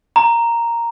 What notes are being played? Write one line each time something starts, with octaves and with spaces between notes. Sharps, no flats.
A#5